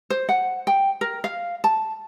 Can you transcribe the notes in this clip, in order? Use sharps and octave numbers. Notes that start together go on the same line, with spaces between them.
C5
F#5
G5
A#4
F5
A5